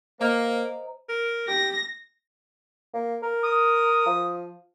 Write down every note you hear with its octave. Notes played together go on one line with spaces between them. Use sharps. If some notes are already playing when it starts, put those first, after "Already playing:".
A#3 C5 D#5 A#5
A#4
G4 A#6
A#3
A#4
D#6
F3